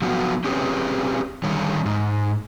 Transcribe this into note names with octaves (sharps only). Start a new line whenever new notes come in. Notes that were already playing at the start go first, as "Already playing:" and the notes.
F3 F#3 B3 F#4
C4 C#4 G4 G#4 B4 C#5
D3 D#3 G3 G#4 C#5
G#2